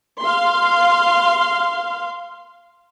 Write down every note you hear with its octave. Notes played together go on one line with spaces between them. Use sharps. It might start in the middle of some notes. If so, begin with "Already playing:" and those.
F5 C6